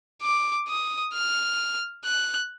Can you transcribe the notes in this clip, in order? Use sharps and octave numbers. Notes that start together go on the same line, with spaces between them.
D6
D#6
F6
F#6